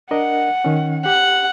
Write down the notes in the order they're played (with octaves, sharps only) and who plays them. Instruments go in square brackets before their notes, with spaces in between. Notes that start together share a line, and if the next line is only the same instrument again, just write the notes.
[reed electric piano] D4 A#4 D#5 [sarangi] F#5
[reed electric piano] D#3 C#4
[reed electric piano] G4 [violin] F#5